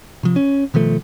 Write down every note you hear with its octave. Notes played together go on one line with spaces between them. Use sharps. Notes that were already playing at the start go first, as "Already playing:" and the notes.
C3 F3
C#4
B2 D#3 F3 A3